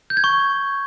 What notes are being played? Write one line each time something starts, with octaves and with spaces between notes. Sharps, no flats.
G6
G#6
C#6